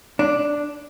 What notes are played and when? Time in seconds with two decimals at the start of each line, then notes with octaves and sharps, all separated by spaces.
0.19 D4